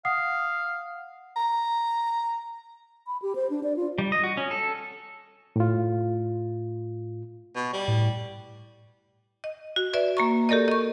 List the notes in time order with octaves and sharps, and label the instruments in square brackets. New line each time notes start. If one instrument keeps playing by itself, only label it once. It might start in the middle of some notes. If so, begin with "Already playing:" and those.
[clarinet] F5 [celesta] F#5 D#6 C7
[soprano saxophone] A#5
[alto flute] B5
G4
C5
D4
D5
F4
[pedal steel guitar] G3
D#5
F#4
C#4
A4
[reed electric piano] A2 F4
[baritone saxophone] B2
G3
[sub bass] A2
[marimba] D#5
F#4
B4 D5 E5
A#3 A#5 C#6
G4 A4 A#4 D5 D#5
D#5 C#6